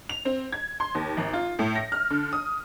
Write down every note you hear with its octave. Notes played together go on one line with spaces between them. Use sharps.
F7
C4
G#6
C6
D#2
G#1
F4
A2
A#6
F6
D3
D#6